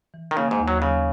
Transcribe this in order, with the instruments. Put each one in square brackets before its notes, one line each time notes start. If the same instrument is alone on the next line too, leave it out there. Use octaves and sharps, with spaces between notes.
[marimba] E3
[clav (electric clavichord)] D#3
[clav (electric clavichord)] C#3 [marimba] A#3
[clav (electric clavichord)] G#2
[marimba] D#2
[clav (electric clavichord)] F#3
[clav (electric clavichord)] C#3 [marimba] F#3